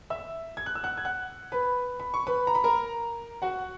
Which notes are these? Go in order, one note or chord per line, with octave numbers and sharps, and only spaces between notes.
E5 E6
G#6
F#6
E6
F#5 F#6
G#6
F#5 F#6
B4 B5
B5
C#6
B4 B5
A#5
B5
A#4 A#5
F#4 F#5